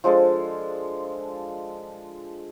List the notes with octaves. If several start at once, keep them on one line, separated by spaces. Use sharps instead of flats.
F3 G#3 D4 A4